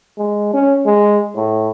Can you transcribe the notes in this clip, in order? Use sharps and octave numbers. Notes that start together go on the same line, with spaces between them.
G#3
C#4
G#3
A2